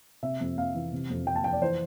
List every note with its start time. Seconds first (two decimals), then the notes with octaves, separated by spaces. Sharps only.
0.23 C3 E5
0.40 F2
0.57 F2 F5
0.75 E3
0.92 C3
1.10 F2
1.27 F2 G5
1.35 A5
1.44 F3 G5
1.53 D5
1.61 E3 C5